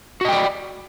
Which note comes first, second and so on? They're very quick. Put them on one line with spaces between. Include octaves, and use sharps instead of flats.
F#4 D#5 G5 D5